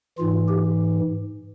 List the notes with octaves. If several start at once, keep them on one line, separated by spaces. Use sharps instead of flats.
G#2 E3 F4
G4